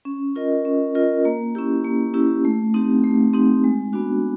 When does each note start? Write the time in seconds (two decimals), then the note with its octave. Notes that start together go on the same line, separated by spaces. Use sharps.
0.05 C#4
0.36 F4 A#4 D#5
0.65 C#4
0.95 F4 A#4 D#5
1.25 A#3
1.55 C#4 E4 G4
1.85 A#3
2.14 C#4 E4 G4
2.45 A3
2.74 C4 D#4 G4
3.04 A3
3.34 C4 D#4 G4
3.64 G#3
3.93 B3 D4 F#4